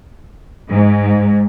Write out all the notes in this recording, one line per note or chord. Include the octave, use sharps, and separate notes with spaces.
G#2